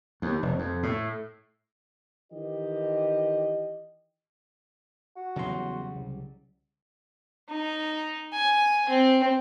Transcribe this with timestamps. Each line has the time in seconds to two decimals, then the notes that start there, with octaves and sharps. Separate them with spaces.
0.22 D#2
0.43 F1
0.59 F2
0.83 A2
2.32 D#3 E3 G4 D#5
5.16 F#4
5.36 E2 C#3 F#3 G3 C6
5.96 C2
7.50 D#4
8.33 G#5
8.89 C4